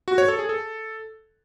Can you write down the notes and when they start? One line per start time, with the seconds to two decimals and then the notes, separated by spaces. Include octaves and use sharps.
0.08 F#4
0.18 C#5
0.28 A4
0.39 G#4
0.49 A4